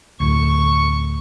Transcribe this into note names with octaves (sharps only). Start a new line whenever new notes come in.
D2 A2 C#6